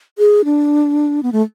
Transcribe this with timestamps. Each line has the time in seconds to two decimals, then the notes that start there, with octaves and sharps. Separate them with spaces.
0.18 G#4
0.45 D4
1.23 B3
1.32 A3